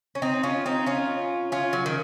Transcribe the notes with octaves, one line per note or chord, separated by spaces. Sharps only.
C#4
C4 D#4
C#4 F4
C4 D#4
C#4 F4
C#4 F4
F#3
D#3